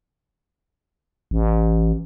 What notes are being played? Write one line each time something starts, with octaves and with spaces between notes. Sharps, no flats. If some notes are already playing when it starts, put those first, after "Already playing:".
A1